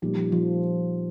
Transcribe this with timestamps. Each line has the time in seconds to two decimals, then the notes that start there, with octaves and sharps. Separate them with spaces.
0.02 A#2 F3 G3 D#4 G4
0.17 F3
0.32 F3